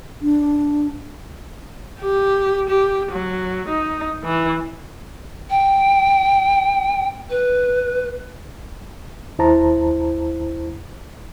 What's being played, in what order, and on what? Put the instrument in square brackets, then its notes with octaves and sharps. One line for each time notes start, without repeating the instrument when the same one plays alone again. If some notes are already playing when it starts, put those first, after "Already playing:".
[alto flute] D4
[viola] G4
G4
F#3
D#4
E3
[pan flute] G5
B4
[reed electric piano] D#2 E4 C5 A5 A#5